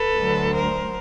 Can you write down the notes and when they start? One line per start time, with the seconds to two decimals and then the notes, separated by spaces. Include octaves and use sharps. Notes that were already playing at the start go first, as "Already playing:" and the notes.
Already playing: A4 B4
0.15 D2 D3 F#3
0.54 A#4 C5